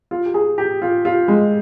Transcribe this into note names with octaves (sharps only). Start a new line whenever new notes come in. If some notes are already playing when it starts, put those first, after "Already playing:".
F4
G4
G#4
G4
F4
F4
G#3